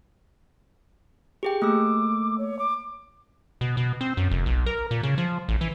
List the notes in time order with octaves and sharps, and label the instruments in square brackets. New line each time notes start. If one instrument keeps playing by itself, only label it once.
[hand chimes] G4 G#4 G5
[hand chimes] A3 A#3 E6 [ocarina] D6
[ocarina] C#5
D6
[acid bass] B2
B2
C4
F#2
F1
B1
A#4
A#2
C#3
F3
A1
E3